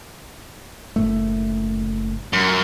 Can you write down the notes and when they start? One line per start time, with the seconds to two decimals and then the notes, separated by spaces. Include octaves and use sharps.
0.96 F#1 A2 A3
2.33 F#2